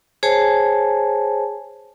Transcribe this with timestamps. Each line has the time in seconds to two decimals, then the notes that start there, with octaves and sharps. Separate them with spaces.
0.23 G#4 C5 C#5 G#5 A5